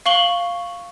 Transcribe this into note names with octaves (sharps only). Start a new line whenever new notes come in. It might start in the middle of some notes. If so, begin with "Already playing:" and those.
F5 C#6 F#7 G7